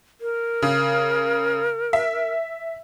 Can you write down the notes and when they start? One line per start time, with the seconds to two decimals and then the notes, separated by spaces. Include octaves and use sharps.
0.21 A#4
0.62 C#3
1.93 E5